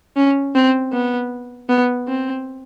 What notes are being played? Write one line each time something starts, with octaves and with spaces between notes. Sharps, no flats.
C#4
C4
B3
B3
C4